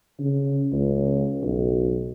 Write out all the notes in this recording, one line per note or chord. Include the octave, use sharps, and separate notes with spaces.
C#3
C#2
B1